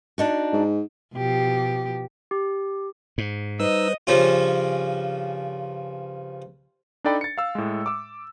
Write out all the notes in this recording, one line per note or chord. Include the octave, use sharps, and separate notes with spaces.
D4 D#4 F#4
G#2
B2 F3 G4
G4
G#2
G3 D#4 B4 C5 D#5 E6
G2 C#3 F3 C#4 F4
D4 D#4 A4 D5 G5 B5
A6 C#7
F5 E6
A2 G#3
D6 E6